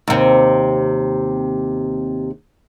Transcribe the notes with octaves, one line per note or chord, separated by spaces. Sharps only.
D#2 C3